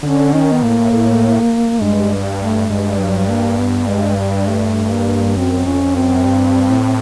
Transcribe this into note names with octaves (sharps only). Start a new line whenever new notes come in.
D3 C#4
D#3 C#4
B3
A2 A#3
A2
G2 G#3
A3
G2 G#3
F#3
A#3
B3
G#3
G3
A3
A#3
F#2 C4
F2 C#4
F#2 C4
G2
A2